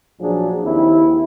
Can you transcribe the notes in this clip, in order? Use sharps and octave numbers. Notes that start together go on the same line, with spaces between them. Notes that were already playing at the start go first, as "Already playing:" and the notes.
A#1 F3 F#3 D4 G#4
D#2 C4 E4